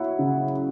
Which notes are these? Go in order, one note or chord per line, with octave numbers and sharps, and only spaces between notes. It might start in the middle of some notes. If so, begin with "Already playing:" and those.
Already playing: F#3 E4 C#5 F#5
C#3